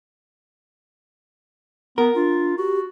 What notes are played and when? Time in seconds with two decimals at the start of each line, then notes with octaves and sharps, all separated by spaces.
1.98 B3 A#4
2.15 D4 F4
2.58 F#4 G4